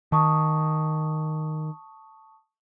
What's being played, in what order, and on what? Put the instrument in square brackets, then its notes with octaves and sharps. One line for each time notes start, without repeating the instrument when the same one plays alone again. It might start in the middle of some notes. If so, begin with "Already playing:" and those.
[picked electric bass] D#3 [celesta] A5 C#6 D#6